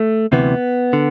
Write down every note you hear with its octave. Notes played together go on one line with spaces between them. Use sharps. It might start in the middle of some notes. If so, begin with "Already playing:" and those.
Already playing: A3
D2 C3 E3 B3
D3